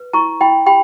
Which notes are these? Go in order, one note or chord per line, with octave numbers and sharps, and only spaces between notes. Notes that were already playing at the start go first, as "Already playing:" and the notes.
Already playing: B4
E4 A#5 C#6
E4 G5 B5
G4 G5 B5